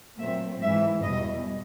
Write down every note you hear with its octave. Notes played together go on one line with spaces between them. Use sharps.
A#2 F#3 A3 C4 E5
G#2 E3 G#3 E5
E2 B2 G3 D#5